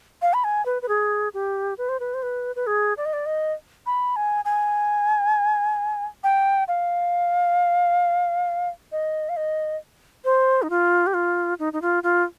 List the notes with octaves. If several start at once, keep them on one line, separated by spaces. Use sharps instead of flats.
F5
B5
G#5
B4
B4
G#4
G4
B4
C5
B4
C5
B4
B4
G#4
D5
D#5
D5
D#5
B5
G#5
G#5
G5
F5
D#5
F5
D#5
C5
D#4
F4
G4
F4
D#4
D#4
F4
F4